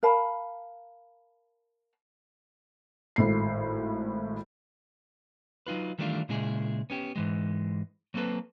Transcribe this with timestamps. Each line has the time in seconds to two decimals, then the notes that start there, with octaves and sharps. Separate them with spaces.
0.03 A#4 F5 A5 B5
3.16 G#1 A2 C7
5.67 F#3 D#4 F4 B4
5.98 D#3 E3 G3 A3 D4 F4
6.29 A#2 C#3 G#3 E4 G#4
6.90 B3 C#4 G4
7.16 G#2 E3 G#3
8.14 F#3 A#3 C4 A4 B4